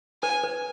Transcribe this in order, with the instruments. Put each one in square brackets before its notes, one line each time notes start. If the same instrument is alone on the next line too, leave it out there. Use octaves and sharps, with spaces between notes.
[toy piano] B4 [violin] G#5
[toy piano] B4